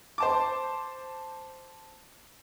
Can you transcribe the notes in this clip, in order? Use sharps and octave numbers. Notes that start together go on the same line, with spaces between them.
C5 A5 D6